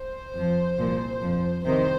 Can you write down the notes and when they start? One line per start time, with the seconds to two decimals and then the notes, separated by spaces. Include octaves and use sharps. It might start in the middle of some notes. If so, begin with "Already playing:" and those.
Already playing: C5
0.34 F2 F3
0.78 C2 A#2 F3
1.21 F2 F3
1.64 C2 C3 D#3 C5